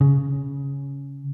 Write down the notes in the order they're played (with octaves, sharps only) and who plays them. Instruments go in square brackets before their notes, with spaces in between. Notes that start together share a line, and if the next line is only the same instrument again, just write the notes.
[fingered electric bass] C#3